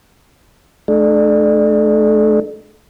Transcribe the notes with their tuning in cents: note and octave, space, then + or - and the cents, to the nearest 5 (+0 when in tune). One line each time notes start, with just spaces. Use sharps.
A3 -30 D4 +30